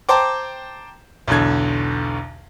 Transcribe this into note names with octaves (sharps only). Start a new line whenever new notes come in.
C5 G5 A5 A#5 C6 D6
B1 E2 B2 D3 G#6